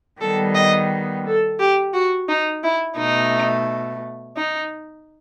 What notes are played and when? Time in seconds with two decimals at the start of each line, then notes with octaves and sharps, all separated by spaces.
0.20 D#3 G3 B3 A4
0.55 D#5
1.25 A4
1.59 G4
1.94 F#4
2.29 D#4
2.63 E4
2.98 B2 A3 D#4
4.37 D#4